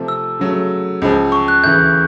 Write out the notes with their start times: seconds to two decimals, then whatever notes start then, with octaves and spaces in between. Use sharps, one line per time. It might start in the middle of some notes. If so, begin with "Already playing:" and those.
Already playing: C3 F3 A3
0.08 E6
0.40 C#3 F#3 A3
1.02 C#2 C#3 F3
1.32 C#6
1.48 F#6
1.64 D2 C#3 E3 G6